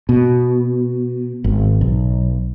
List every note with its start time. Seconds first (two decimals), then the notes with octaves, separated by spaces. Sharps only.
0.09 B2
1.44 G#1
1.81 B1